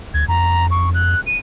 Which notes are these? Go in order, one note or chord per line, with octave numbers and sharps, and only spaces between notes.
D2 G#6
F2 A#5
C#6
F#6
D#7